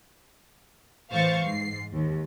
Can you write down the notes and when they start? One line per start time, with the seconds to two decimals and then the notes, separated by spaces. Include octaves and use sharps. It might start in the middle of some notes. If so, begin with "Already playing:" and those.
1.12 A2 E3 C5 F5 C#6 A6
1.44 G#2 C7
1.93 D#2